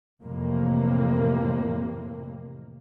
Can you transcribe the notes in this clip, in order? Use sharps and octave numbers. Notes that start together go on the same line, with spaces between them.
F2 A2 C3 E3 A#3